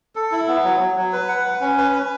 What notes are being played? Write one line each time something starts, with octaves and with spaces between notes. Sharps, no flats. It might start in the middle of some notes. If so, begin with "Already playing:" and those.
A4
E4
B3
F#3
F#3
F#3
B4
F#5
B4
C#4
B4
B4